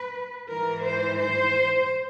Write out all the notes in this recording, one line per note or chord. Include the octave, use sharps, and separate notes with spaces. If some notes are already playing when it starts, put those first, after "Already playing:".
Already playing: B4
G#2 E3 A#4
C5
C5